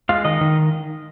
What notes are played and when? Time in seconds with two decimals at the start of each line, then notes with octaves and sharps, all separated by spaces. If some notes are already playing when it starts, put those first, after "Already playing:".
0.09 G#3 F4 F5
0.25 D#3 D#4 D#5
0.41 D#3